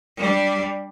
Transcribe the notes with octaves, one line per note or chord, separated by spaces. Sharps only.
G3 D4